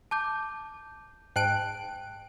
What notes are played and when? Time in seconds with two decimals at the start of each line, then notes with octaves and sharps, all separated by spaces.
0.11 A5 D6 G6
1.36 G#2 G5 A5 F#6 D7